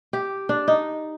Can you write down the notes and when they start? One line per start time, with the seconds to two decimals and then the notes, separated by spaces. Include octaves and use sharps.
0.13 G4
0.49 D4
0.68 D#4